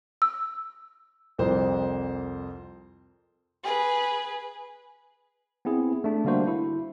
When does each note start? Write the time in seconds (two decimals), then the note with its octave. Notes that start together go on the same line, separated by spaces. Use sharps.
0.22 E6
1.38 C2 F2 C5
3.63 G#4 B4
5.65 B3 C4 E4 G#4
6.04 A3 D4
6.25 D3 G3 A#3 D4 F#4 C5
6.47 E4